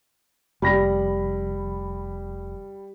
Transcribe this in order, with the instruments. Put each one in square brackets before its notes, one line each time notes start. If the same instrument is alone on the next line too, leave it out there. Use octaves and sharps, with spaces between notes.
[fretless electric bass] F1 [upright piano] G3 B5 A#6